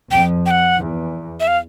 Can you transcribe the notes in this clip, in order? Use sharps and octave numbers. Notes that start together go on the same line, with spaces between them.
F2 G5
G5
F#5
E2
E5
F5